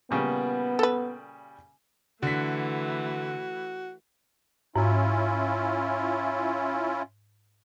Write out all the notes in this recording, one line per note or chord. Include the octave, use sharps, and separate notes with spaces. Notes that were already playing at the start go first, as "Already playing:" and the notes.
A#2 C#3 G3 B3
A4 B4
D3 E3 A3 F#4 B6
G#2 C#4 E4 F4